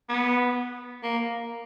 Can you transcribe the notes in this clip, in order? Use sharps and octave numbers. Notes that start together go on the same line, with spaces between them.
B3
A#3